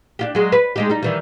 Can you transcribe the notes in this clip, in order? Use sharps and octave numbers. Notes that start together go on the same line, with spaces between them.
D4 F4 G4
F#3 G#3
B4
G#3 D#4 G4
G3 D#4
D#3 E3 G3